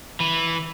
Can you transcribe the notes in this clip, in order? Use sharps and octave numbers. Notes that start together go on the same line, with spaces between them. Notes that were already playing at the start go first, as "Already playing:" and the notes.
E3